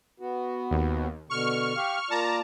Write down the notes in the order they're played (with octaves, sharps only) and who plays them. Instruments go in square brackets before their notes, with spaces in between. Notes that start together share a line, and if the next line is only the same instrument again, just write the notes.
[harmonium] B3 F#4
[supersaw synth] D#2
[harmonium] B2 D3 [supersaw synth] C#6 F6
[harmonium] G4 F5
[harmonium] A#3 F4 D5 [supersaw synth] A5 A#5